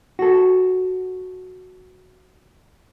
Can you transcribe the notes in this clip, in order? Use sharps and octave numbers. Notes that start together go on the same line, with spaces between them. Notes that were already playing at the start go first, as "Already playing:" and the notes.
F#4 A4